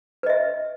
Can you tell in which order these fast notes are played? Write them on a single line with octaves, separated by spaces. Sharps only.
B4 D#5 E5